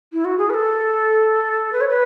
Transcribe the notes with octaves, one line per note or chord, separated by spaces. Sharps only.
E4
F#4
G#4
B4
A4
B4
C#5
B4